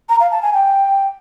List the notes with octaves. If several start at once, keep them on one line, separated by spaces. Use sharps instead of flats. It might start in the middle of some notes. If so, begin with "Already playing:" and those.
A#5
F5
A5
G#5
G5